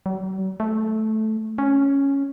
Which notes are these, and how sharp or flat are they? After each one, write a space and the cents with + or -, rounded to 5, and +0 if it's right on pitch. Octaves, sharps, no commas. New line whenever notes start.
F#3 +45
A3 -10
C#4 +0